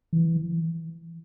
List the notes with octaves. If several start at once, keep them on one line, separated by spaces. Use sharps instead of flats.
E3